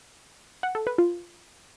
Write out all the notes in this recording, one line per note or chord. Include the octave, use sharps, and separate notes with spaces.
F#5
A4
B4
F4